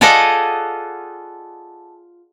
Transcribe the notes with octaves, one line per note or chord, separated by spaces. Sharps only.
F4 G#4 A4 D5 D#5 F#5